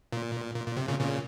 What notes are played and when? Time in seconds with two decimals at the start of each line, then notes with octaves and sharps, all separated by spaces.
0.12 A#2
0.56 A#2
0.67 A#2
0.77 C3
0.88 A#2 C#3
0.99 A#2 C#3